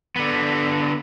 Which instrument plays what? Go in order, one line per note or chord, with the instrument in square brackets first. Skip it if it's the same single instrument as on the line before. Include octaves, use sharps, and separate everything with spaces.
[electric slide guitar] D3 B3